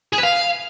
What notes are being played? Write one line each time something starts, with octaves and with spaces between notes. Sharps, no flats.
G#4
B4
F5